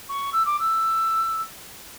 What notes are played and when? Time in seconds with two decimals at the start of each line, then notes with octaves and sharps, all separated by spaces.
0.09 C#6
0.33 E6
0.46 D6
0.60 E6